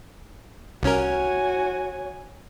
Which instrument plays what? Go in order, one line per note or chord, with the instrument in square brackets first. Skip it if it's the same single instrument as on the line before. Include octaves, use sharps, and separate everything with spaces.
[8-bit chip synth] C2 C#4 A#4 [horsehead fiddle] F#4 G#5 [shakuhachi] C#5